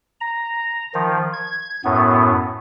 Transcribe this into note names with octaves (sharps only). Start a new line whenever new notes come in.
A#5
D#3 F3
G#6
F#2 A2 B3